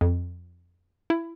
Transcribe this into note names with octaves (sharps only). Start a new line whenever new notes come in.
F2
E4